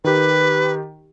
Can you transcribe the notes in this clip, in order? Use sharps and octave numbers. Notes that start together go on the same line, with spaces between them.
D#3 G4 B4